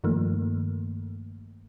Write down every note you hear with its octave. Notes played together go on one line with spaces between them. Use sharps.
G2 D#3 F3 A3 A#3